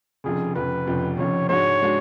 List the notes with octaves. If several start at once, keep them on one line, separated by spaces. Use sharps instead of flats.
F1 F2 C#3 G#4
F1 F2 C#3 B4
F1 F2 C#3
F1 F2 C#3 C#5
G#2 G#3 D4 F#4 C#5
G#3 D4 F#4